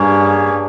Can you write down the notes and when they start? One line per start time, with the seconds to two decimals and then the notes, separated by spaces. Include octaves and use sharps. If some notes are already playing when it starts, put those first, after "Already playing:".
Already playing: G2 A#3 C#4 G#4 C#5